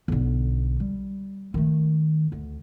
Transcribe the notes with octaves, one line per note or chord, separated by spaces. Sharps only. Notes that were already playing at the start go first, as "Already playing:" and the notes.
B1 D3
G3
D#3 A3
D2